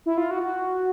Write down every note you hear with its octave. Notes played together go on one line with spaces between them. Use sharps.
E4
F4
F#4
F#4